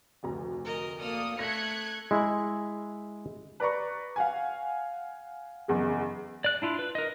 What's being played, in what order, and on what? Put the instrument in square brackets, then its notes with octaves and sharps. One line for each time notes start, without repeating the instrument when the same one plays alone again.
[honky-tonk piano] F1 D2 A#5
[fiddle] A#4 D#5
[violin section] A#3 D5 D#6 [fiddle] A4 F6
[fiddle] A3 [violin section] F#6 G#6 C#7 [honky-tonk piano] A#6 B6
[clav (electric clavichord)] G#3 E4
[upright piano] B4 D5 A#5 C#6
F5 F#5 G#5
F#1 E2 G#4
[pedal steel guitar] D5 F#6
D4 E4 F4
B4
A#4 D#5